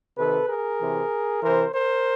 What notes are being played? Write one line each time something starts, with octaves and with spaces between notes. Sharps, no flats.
C3 D#3 A4 B4
G#4 A#4
C3 E3
C3 E3 A#4 C5
A#4 C5